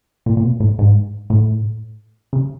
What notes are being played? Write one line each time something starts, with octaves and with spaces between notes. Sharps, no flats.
A#2
A#2
B2
A2
G#2
A2
C#3